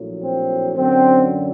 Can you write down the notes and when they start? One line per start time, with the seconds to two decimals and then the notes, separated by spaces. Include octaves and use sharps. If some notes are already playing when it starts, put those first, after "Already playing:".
Already playing: A#1 A2 F#3
0.22 C4
0.76 F#2 D3 F#3 C4